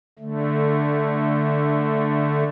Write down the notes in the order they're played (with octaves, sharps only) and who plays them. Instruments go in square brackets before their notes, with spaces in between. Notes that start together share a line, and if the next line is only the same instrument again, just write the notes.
[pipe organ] D3 A3